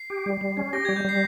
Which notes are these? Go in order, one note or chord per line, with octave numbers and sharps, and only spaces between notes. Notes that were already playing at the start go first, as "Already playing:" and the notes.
Already playing: C7
G4
G3
G3
C#4
G4 A#6
G3 G#6
G6
G3 C7